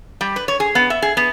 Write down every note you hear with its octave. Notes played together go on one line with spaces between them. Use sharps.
G3
B4
C#5
G#4
B3
E5
G#4
B3